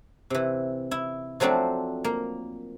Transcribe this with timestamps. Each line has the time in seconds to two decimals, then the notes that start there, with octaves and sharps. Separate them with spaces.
0.30 C3 E3
0.91 E4
1.40 F3 F#3 A3 C4 D4
2.04 A#3